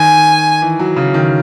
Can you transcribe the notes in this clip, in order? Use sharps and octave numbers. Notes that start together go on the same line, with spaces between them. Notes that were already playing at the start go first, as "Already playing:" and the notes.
Already playing: D#3 G#5
E3
F#3
C#3
D#3